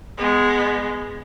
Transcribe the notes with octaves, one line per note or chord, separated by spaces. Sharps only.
G#3 B3